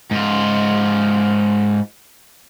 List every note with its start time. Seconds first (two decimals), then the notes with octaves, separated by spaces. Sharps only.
0.11 G#2 F4